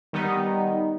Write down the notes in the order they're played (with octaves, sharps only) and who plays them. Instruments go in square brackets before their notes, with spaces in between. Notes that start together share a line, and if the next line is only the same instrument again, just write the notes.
[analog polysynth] D#3 G3 B3 D#4